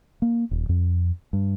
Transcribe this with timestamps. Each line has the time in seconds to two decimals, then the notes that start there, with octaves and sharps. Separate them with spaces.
0.22 A#3
0.51 D#1
0.69 F2
1.33 G2